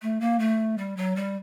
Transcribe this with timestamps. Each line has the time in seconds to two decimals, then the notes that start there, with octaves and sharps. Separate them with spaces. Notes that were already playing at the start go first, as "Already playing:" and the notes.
0.02 A3
0.21 A#3
0.39 A3
0.78 G3
0.97 F#3
1.16 G3